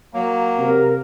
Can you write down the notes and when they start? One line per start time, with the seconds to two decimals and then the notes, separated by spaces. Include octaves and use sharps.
0.14 F#3 A#3
0.58 C3 A#4